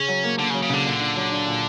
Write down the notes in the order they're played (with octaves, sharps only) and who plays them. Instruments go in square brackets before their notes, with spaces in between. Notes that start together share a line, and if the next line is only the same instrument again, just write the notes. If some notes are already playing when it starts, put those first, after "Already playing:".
Already playing: [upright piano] C#3 [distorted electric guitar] C#4
[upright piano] F#3
A#3
[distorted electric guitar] D3 [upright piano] A#3
[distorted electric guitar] C#3
[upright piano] F#3
[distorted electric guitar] C#3
[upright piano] C#2 [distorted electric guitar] D3
[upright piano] A#2
D4
F#3
D4
A#2